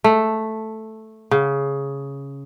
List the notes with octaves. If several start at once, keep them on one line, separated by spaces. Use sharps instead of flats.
A3
C#3